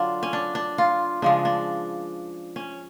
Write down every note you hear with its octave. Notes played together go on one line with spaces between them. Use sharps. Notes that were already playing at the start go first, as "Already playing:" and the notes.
Already playing: D3 F#3 D4 F4
C#4
D4
D4
F4
C#3 F3 G#3 D4
D4
C#4